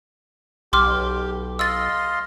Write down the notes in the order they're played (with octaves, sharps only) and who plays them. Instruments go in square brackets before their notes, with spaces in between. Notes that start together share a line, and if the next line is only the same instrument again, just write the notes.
[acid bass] B1 [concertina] G4 [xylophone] C6 D6 F6
[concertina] D#5 F5 C6 [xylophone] E6 A6